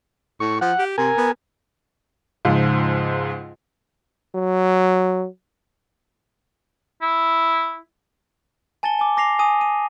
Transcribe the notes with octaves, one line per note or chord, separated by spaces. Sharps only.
A2 C#6
F3 F#5
G4
C3 A#4 G#5
B3
C#2 G#2 F3
F#3
E4
G#5 A5 A6 C#7 G7
G#5 D6
D6 A#6 C7 F7
G#5 D#6 D#7
D#7